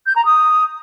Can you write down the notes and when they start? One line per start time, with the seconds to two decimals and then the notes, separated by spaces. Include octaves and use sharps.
0.06 G6
0.15 A#5
0.25 D#6